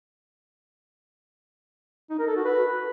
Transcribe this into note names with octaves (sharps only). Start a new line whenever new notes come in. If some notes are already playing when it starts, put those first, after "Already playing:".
D#4
A#4
A4
F#4
B4